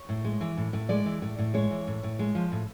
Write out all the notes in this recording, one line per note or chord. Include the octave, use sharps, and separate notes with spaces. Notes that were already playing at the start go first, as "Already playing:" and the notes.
Already playing: C#5
A2
G#3
E3
A2
A2
G#3 D5
E3
A2
A2
G#3 C#5
E3
A2
A2
G#3
F3
A2